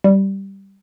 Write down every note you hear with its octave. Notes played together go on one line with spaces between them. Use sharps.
G3